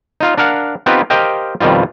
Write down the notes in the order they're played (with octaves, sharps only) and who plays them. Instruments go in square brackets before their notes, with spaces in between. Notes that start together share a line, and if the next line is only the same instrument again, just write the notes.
[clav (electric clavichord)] D#4 F4 F5
D4 A#4 F5 F#5
B3 C4 D#4 F4 G4 B4
G4 A#4 C5 D#5 F5 G5
F2 B2 D#3 G3 F4